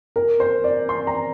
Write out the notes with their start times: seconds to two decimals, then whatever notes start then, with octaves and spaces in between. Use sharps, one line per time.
0.16 A#4
0.40 C5
0.64 D5
0.89 C6
1.07 A#5